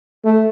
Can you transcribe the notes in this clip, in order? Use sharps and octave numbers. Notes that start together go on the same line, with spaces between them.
A3